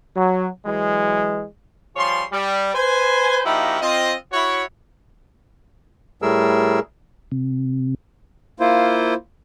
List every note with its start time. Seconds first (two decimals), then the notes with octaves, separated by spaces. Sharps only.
0.16 F#3
0.66 E3 F#3 G#3
1.96 F3 G3 G#4 C#5 C6
2.32 G3
2.75 B4 C5 G#5
3.45 F3 A#3 D#4 E4 F#4 G4
3.81 C4 F4 D#5
4.32 E4 F#4 C#5
6.22 A2 G3 A3 G#4 A#4 E6
7.32 C3
8.60 A#3 E4 F4 C5